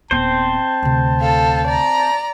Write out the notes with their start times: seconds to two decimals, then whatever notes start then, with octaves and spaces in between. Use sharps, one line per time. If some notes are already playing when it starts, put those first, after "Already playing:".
0.11 D#1 B3 C4 C5 A5
0.82 D2 C3
1.21 A4 F5
1.67 D5 A#5